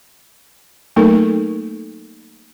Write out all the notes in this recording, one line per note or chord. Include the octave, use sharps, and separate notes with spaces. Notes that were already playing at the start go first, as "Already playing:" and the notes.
F#3 A3 A#3 D#4 A4 A#4